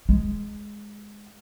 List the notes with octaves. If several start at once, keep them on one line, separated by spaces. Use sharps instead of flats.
G#3